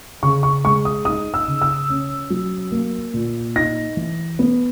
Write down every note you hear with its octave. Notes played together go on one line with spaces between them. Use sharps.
C#3 C#6
C#6
G#3 C#6
D#6
D#4 D#6
E6
C#3
E6
C#4
F#3
A#3
A#2
D#4 A#6
E3
B3